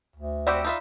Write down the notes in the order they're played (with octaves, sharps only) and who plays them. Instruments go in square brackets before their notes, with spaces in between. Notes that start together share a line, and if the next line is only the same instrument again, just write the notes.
[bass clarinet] D2
[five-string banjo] C4 F#4 G4 [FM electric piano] D5 B5 E6
[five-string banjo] D#4 F4 E5